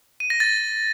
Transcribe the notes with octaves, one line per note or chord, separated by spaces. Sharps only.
D#7
A#6
A6